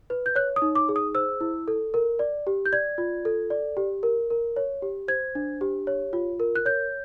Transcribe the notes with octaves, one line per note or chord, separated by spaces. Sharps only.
B4
G6
C#5 F#6
D#6
D#4
D6
G#4
D#6
C5 E6
E4
A4
A#4
D5
G4
G6
D5 G#6
F4
A4
D5
G4
A#4
A#4
C#5
G4
C5 G#6
D4
G4
C#5
F4
A#4
F#6
C#5 G6